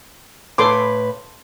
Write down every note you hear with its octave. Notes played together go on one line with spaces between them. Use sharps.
A2 A4 B4 C6 D6